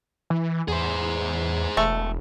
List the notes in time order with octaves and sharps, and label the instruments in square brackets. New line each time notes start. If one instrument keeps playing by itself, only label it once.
[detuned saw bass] E3
[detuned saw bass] E2 [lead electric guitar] G#4 C5
[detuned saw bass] E1 [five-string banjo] A3